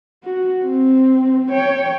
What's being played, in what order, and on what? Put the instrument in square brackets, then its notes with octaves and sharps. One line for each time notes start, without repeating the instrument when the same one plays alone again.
[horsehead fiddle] F#4
C4
C#5 G5